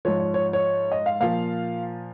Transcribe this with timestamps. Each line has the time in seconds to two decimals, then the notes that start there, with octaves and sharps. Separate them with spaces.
0.05 G#2 F3 C#5
0.20 C#5
0.34 C#5
0.53 C#5
0.92 D#5
1.06 F5
1.20 A#2 F3 F5